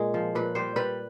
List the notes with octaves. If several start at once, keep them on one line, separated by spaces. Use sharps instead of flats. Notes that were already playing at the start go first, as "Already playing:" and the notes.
Already playing: A#2 G#3
F3
A#2 B4
G3 C5
G3 B4